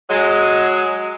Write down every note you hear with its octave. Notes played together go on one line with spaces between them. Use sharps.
F#3 G#3